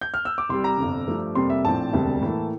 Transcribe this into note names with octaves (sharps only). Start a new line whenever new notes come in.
G6
F6
E6
D6
C2 C3 G3 C6
A#5
G1 F2 C3
G2 F3 A3
F2 C3 G3 A#3 C6
E5
A#1 A2 F3 C4 A5
E1 D2 C3 G3 C4
A2 E3 A#3 E4